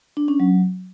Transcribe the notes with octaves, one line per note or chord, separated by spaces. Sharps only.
D4
C#4
F#3